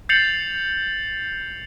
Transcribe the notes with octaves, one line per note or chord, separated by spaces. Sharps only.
G6 A6 C7 C#7 F7 F#7